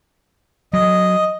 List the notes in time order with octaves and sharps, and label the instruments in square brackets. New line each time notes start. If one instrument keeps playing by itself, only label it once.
[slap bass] F#3 [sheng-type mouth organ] D#5